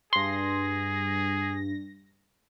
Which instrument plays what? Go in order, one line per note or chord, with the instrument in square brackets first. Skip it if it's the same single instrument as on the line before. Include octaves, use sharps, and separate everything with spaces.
[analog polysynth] G2 A#6 [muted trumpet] G#4 [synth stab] C6